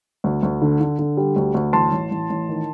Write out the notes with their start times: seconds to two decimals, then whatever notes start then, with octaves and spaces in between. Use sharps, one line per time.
0.24 D2
0.43 D2
0.62 D3
0.81 D3
0.99 D3
1.17 G3
1.36 D2
1.54 D2
1.73 A1 A5 C6
1.92 A1
2.11 A1
2.30 A1
2.49 D#3